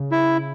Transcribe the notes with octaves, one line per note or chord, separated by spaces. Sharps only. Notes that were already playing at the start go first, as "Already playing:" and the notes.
Already playing: C#3
E4